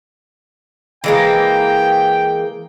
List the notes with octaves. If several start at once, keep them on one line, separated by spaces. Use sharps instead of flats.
E3 G#3 A#3 G5